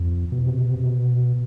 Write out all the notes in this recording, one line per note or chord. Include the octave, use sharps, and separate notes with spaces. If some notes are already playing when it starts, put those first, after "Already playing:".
Already playing: F2
B2
C3
B2
C3
B2